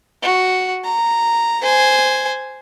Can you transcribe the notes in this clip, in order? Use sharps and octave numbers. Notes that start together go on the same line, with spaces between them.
F#4
A#5
C5 G#5